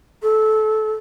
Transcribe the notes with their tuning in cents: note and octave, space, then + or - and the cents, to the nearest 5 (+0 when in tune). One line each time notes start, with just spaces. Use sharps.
A4 -20